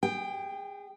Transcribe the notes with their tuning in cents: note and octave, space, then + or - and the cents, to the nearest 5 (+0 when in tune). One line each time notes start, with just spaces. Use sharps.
G#4 -30 G5 +0